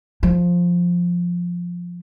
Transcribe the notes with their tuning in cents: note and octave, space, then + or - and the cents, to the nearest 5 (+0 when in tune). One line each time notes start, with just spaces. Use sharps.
F3 +5